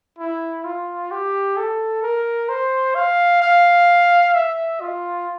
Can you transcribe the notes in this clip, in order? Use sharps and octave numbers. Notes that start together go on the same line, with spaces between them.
E4
F4
G4
A4
A#4
C5
F5
F5
E5
F4